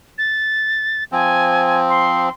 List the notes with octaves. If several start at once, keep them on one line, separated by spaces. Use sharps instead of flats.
A6
F3 C4 G#5
C6